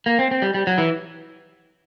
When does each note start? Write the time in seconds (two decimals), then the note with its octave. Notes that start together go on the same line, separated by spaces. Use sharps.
0.06 A#3
0.19 C4
0.31 C4
0.42 G3
0.54 G3
0.67 F#3
0.78 E3